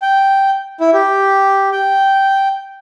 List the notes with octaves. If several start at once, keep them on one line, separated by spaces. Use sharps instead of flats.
G5
E4
G4
G5